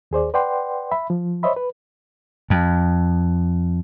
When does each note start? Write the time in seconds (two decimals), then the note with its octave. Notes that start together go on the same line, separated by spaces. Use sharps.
0.11 D#2 G#4 C5 D5
0.34 B4 D5 F#5 G5 C6
0.91 E5 B5
1.10 F3
1.43 C5 C#5 D#5 E5 B5
1.56 B4
2.50 F2